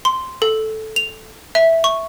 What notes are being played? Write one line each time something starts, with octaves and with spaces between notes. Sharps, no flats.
C6
A4
F7
E5
C#6